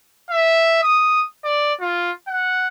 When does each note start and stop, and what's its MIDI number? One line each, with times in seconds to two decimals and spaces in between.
0.30 0.78 76
0.82 1.25 87
1.44 1.73 74
1.80 2.12 65
2.28 2.68 78